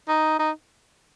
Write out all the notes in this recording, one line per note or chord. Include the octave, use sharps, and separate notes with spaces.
D#4
D#4